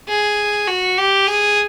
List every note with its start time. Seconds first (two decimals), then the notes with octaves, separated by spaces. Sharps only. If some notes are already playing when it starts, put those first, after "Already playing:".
0.08 G#4
0.68 F#4
0.97 G4
1.27 G#4